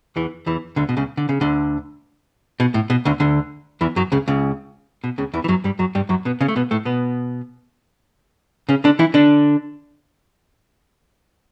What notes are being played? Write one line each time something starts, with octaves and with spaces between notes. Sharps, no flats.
E2 E3
E2 E3
D2 D3
B2
C#2 C#3
D3
C#3
D2 D3
B2
A2
B2
D2 D3
D2 D3
E2 E3
F#2 F#3
C#2 C#3
C#2 C#3
B2
C#2 C#3
E2 E3
E3
F#2 F#3
G2 G3
F#2 F#3
G2 G3
F#2 F#3
B2 B3
C#3 C#4
A3
B2 B3
A2 A3
B2 B3
C#3 C#4
D3 D4
E3 E4
D3 D4